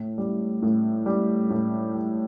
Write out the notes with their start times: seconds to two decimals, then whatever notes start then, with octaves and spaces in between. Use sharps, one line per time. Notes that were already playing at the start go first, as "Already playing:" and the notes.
Already playing: A2
0.18 G3
0.63 A2
1.06 G3
1.50 A2
1.94 G3